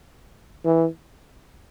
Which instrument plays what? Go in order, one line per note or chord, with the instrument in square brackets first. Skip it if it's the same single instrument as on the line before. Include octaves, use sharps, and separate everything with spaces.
[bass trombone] E3